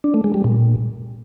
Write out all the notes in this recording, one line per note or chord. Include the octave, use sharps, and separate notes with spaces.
D4
A3
G#3
G3
A#2